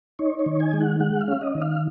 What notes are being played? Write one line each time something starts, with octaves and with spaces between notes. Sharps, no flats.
D#4 C#5
C#5
D#3
G#5
G#3
F#5
G#3 F#5
F5
C#4
D#5
D#3
F5